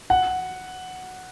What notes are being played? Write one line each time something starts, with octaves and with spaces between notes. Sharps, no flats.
F#5